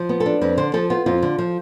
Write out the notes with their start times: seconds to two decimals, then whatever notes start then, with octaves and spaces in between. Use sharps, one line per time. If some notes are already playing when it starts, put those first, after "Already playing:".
Already playing: F3
0.09 B3
0.20 A4
0.26 D4
0.41 F2 B4
0.57 D3 C5
0.74 F3 A4
0.90 B3 F4
1.06 F2 F4
1.22 D3
1.38 F3